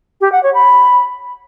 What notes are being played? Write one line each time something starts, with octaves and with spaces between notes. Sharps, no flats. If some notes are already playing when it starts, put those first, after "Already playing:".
G4
F#5
C#5
B5